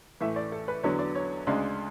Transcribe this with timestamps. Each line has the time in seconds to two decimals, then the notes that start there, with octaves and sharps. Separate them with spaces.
0.21 A2 E3 A3 E5
0.36 D5
0.52 A4
0.68 B4
0.83 E2 D3 F#3 B3 D4 C#5
0.99 D5
1.15 C#5
1.47 D2 C#3 G#3 D4